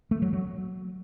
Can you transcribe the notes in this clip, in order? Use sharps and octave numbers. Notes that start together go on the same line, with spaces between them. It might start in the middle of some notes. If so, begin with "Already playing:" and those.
A3
F#3
F#3